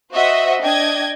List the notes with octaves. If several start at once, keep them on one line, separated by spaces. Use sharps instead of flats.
F#4 C5 D#5 E5 F#5
D4 D#5 G5 G#6